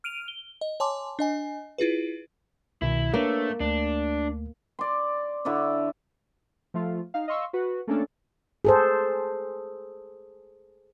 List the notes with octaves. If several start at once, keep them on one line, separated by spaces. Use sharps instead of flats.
F6 D7 D#7 F7
G7
D#5
C#5 G#5 A5 C6 D6
D4 D#5 G#5
E4 F4 G#4 B4
C2 B2 D#3 E4
A3 A#3 D4 B4 C#5
D2 A3 D4
D5 C6
D3 E4 C#5 D5
F3 A3 F4
D#4 F5
D#5 F5 C6 C#6 E6
F#4 B4
A3 A#3 C#4 D4 A4
G#4 A4 C5